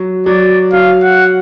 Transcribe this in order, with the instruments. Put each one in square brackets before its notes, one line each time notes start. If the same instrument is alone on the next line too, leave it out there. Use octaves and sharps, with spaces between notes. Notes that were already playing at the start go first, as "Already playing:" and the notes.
Already playing: [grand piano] F#3
[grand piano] F#3 [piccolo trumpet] D5
[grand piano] F#3 [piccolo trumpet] F5
[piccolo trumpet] F#5